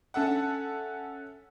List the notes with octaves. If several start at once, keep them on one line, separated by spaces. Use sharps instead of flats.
C#4 A4 E5 F#5